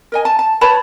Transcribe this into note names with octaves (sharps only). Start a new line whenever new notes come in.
A#4 D#5 G#5
A5
A5
B4 C#5 A5 B5